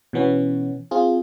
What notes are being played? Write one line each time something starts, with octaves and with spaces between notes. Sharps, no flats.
B2 E3 B3 C#4
C4 F4 G#4